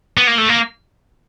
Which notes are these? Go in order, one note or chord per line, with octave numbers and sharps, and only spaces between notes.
B3
A#3
A3
A#3